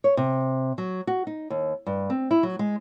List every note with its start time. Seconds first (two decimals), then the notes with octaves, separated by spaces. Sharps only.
0.04 C#5
0.17 C3
0.78 F#3
1.07 F#4
1.27 D#4
1.50 D#2
1.86 G2
2.10 C4
2.31 E4
2.43 F#3
2.59 G#3